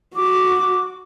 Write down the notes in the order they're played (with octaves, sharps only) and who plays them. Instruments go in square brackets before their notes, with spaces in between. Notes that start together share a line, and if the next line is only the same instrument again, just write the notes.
[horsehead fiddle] F#4 [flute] D6